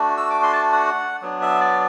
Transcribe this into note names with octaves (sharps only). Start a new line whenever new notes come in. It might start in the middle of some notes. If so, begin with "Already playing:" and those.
Already playing: A3 D4 F#4
E6
D6
C6
A5
F#5
F#3 B3 D4
E5
D5